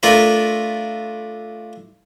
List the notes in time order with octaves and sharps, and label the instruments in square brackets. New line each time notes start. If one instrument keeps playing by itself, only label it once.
[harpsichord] A3 D4 F4 A#4 B4